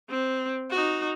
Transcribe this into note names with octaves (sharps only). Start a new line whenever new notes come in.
C4
D#4 F#4